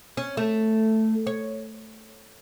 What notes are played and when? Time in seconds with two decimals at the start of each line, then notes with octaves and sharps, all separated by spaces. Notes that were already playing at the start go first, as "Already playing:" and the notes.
0.17 C#4
0.37 A3
1.27 C#5